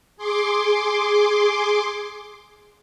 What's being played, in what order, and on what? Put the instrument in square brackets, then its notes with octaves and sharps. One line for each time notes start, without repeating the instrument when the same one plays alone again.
[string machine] G#4 C6 D6